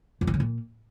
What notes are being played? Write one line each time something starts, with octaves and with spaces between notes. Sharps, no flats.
F2
D#3
C#3
A#2